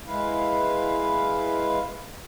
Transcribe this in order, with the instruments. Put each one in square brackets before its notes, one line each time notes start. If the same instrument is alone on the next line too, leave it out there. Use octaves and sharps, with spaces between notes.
[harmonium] G#3 E4 B4 F5